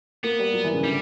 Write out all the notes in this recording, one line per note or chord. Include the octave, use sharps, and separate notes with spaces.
A#3 B3
G3
F#3
E3
C#3
D3 G3